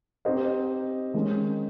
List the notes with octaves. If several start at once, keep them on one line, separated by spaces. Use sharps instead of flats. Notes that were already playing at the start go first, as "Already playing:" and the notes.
C4 D#4 G4 C5 D#5
D#3 G#3 C#4